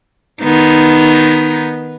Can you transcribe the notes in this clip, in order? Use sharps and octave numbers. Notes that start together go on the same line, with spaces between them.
D#3 B3 D#4